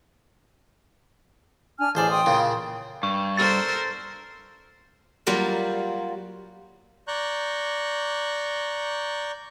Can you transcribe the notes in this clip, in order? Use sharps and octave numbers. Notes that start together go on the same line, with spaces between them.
D4 G#5 F6
A1 G#4 C5 D5 A5
G5 C6 D#6
A#2 C#3
G2 C#6
A4 A#4 C5 A6
F#3 G3 A#3 F4
D5 A#5 C#6 F#6 G6